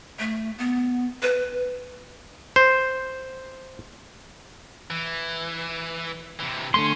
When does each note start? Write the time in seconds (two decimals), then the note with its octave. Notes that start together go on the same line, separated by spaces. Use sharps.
0.19 A3
0.58 B3
1.22 B4
2.56 C5
4.90 E3
6.39 C3 E3
6.74 D3 A3 C#4 C6